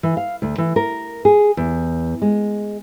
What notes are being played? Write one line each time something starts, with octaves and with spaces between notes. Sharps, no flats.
E3
F5
D2
E3
A#4
G#4
E2
G#3